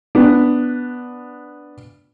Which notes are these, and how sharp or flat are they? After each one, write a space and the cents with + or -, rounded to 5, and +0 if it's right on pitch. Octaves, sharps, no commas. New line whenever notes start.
B3 +0 D4 +0